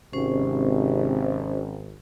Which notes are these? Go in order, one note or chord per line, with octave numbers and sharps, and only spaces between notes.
G#1 C3 C#4 C5